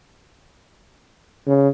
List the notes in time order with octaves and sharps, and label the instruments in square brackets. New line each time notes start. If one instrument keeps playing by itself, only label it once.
[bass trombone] C#3